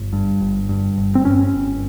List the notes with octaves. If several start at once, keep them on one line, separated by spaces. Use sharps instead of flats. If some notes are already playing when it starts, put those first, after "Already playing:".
Already playing: G1
G2
G1
G2
G1
C4
G2 C#4
G1